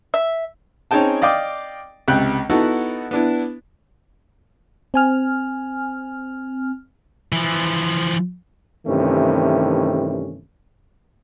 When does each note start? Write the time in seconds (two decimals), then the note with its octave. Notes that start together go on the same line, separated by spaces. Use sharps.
0.14 E5
0.91 C4 C#4 D#4 G#4 G5 A5
1.21 D5 D#5 F5 G5 D6 D#6
2.08 C#2 C3 G5 F#6
2.50 B3 D#4 E4 F#4 A4 F#5
3.11 B3 D4 E4
4.94 C4 G#5 F6
7.32 E3 F3
8.87 G2 C3 D#3 E3 A3 C#4